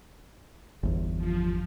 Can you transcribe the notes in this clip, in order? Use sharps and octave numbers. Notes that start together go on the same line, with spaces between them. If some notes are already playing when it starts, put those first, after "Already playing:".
G1 E2
F3